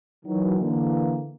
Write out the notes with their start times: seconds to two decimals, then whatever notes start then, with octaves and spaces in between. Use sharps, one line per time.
0.25 D#3 E3 F#3
0.59 D3 E3 A#3